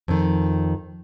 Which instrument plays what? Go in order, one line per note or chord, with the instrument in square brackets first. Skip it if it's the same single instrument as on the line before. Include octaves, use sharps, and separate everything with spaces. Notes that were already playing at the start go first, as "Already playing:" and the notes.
[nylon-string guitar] F2 D#3